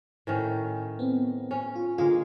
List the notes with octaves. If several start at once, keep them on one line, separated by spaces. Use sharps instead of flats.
A2 D#3 C#4
B3 C4
C#4
F4
D3 G#3 A#3 F4 G#4